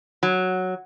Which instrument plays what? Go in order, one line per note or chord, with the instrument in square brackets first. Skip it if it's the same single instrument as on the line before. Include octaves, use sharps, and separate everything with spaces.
[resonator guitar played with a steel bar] F#3